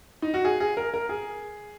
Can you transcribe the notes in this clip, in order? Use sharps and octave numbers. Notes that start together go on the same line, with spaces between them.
D#4
F#4
G#4
G#4
A#4
A#4
G#4